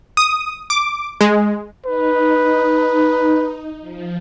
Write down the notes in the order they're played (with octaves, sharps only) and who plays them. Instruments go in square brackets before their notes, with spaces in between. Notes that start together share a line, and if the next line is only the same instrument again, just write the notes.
[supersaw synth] D#6
D6
G#3
[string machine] D#4 [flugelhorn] B4
[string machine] F3